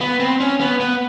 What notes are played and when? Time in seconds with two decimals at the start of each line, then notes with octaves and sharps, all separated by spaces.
0.01 B3
0.20 C4
0.40 C#4
0.61 B3
0.80 B3